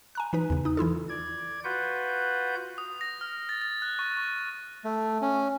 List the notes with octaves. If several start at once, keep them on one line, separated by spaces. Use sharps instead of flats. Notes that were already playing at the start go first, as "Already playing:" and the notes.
G#5 A#5 F#6
E3 D#4 B4
E2 C#3
D#4 D#6
E3 E4 F4 A4
D5 G#6
F4 F#4 B4 F#5 G6
D#6
A#6
F6
A6
A6
F#6
C#6
C#6
A3
C#4